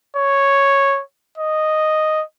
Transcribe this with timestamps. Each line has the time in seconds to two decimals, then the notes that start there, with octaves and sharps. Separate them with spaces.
0.17 C#5
1.38 D#5